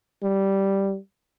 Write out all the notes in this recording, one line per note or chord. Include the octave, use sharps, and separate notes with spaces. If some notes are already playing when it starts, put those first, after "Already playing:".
G3